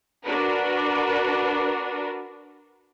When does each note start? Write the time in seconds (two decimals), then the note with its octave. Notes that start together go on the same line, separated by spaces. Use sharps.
0.24 D4 F#4 A#4 B4